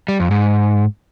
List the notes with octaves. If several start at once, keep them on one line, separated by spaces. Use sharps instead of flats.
G3
F2
G#2